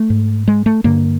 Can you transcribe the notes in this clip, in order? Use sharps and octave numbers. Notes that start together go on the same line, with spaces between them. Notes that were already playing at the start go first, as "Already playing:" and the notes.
Already playing: A3
G#2
G#3
A3
G2 D3 A#3